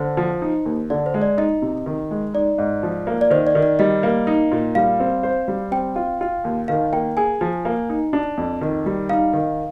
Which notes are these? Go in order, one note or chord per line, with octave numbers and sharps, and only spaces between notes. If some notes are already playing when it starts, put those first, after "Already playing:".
Already playing: D3 C5
F3
D#4
D#2
D3 D5
C5
G#3
D5
D#4 D#5
C3
D#3
G#3
D#4 D5
G#2
F3
A#3
D5
D#3 C5
D5
D#3
D5
G3 D#5
A#3
D#4
A#2
G3 F5
C4
C5
G3
C4 G5
F4
F4
D#2
D#3 F5
A#3 G5
G#4 G#5
F3
A#3
D#4
D4
F2
D#3
G3
D#4 F5
D#3